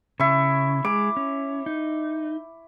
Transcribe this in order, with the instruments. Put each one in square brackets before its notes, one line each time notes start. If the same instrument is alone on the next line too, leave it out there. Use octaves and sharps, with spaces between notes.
[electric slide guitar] C#3 [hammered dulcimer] E4 C#6
[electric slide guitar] G#3 [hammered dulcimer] D6
[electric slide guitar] C#4
D#4